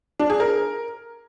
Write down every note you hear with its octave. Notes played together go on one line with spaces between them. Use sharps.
D4
G#4
A#4